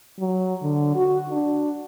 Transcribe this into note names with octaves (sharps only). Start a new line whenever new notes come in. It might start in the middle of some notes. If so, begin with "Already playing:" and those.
F#3
D3
F#4
D4